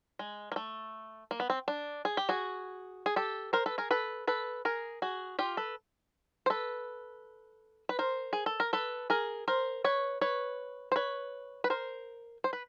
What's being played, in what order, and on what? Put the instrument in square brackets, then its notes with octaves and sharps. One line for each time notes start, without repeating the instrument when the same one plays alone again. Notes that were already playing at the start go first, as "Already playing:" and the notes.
[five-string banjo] G#3
A#3
A3
A#3
B3
C4
D4
G#4
G4
F#4 G#4
G#4
G4 A4
A#4 C5
A4 B4
G#4 A#4
A4 B4
A4 B4
G#4 A#4
F#4 G#4
F4 G4
A4 B4
C5
A4 B4
B4
A#4 C5
G#4
A4
A#4
A4 B4
G#4 A#4
A#4 C5
B4 C#5
B4 C#5
C5
B4 C#5
B4
A#4 C5
C5
B4